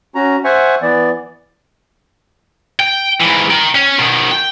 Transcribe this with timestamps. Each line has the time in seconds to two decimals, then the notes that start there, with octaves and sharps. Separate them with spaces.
0.15 C#4 F#4 A#5
0.44 C5 E5 F#5 G#5 C#6
0.82 E3 B3 D5
2.80 G5
3.21 G#2 E3
3.51 A#4 G5
3.75 C#4
3.99 B2 D#3
4.31 G5